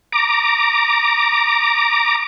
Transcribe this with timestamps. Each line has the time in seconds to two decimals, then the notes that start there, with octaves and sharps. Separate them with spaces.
0.12 A#5 D6